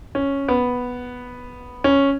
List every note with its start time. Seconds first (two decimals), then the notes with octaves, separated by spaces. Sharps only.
0.15 C#4
0.48 B3
1.84 C#4